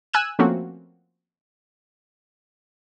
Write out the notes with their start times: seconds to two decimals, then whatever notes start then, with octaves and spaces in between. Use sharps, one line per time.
0.14 G#5 E6 F#6 D#7
0.39 F3 A3 A#3 C4 C#4 F#4